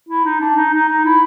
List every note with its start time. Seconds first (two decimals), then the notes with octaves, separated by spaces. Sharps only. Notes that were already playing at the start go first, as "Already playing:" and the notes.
0.09 E4
0.25 D#4
0.40 D4
0.57 D#4
0.73 D#4
0.88 D#4
1.05 E4